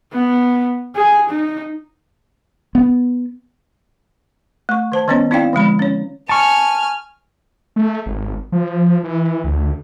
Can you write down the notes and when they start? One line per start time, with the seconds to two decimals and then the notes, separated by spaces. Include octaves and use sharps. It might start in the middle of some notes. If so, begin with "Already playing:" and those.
0.13 B3
0.96 G#4
1.29 D#4
2.75 B3
4.69 A3 C#6
4.92 D#3 C5 A5
5.08 D#3 G3 B3 C#4 C#5
5.31 C4 D#4 E4 D5 F5 G5
5.53 D3 F3 G#3 B5
5.79 C#4 C#5
6.29 G#5 A5 C#6 F6
7.76 A3
8.06 G#1
8.52 F3
9.04 E3
9.44 D2